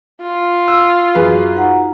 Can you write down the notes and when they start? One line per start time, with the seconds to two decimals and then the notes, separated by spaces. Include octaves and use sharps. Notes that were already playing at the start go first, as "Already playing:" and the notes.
0.21 F4
0.68 E6
1.15 F#2 G#4 B4
1.55 D#4 F#5 A#5